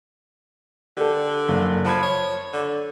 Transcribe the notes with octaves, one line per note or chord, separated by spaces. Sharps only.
D3 G4 A4
F#1
F3 A5 B5 G#6
C#5
D3